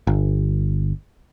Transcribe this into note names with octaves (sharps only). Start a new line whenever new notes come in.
G1